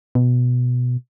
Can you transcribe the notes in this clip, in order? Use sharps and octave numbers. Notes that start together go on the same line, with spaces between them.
B2